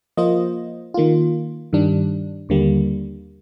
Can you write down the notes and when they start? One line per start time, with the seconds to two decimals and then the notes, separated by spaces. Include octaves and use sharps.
0.17 F3 A#3 F4 C5 D#5
0.94 D#3 A#3 F4
1.73 G2 D#3 G3 D4
2.49 D#2 D3 G3 A#3